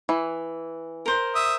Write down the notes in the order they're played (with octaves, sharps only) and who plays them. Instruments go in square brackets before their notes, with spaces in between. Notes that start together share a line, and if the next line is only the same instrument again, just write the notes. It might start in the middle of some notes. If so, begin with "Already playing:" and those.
[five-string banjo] E3
[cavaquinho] A#4 C5
[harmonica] E5 D#6